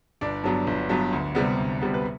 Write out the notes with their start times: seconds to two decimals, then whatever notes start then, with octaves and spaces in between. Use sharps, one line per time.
0.21 G1 D4 D5
0.44 G2 F#3 B3
0.67 G1
0.89 G2 F#3 B3
1.13 D2
1.35 C3 G3 B3
1.58 D2
1.81 C3 G3 B3
1.94 B4